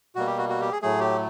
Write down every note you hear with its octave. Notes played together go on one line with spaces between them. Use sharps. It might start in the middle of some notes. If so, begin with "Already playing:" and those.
B2 G3 A#3 F#4
G4
F#4
F#4
G4
G#4
A2 F#3 A3 G#4
G4